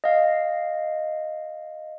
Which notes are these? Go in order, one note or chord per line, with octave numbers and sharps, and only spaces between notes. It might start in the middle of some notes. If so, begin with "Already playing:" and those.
D#5 F5